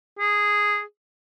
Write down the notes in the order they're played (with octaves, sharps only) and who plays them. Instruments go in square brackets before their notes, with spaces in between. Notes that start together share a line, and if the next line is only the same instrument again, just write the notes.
[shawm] G#4